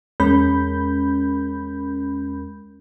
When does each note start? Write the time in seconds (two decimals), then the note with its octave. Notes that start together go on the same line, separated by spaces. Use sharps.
0.20 E2 G#3 C#4 A#4 B5 G6